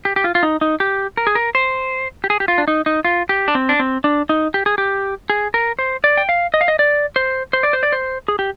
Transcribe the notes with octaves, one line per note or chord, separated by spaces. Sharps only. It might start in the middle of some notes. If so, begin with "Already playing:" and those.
G4
G4
F4
F4
D#4
D#4
G4
A#4
G#4
A#4
C5
G4
G#4
G4
F4
D4
D#4
D#4
F4
G4
D4
C4
D4
C4
D4
D#4
G4
G#4
G4
G#4
A#4
C5
D5
G5
F5
D#5
F5
D#5
D5
C5
C5
D5
C5
D5
C5
G#4
G4